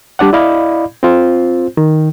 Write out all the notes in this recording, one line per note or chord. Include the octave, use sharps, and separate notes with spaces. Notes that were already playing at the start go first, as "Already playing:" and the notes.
G3 D4 D5 F#5
E4 D5 D#5 F5 B5
C4 F4 C5
D#3